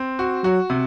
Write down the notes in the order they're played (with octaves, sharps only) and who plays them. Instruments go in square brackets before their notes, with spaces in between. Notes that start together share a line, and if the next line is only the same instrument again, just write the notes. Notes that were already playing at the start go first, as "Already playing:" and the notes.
Already playing: [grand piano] C4
F#4
[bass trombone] F#3 [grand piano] F#4
[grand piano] C3